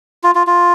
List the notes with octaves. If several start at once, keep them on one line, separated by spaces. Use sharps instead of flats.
F4
F4
F4